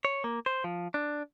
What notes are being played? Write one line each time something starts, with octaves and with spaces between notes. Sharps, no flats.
C#5
A#3
C5
F3
D4